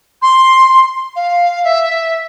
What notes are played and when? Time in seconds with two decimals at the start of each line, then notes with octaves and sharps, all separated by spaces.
0.22 C6
1.16 F5
1.64 E5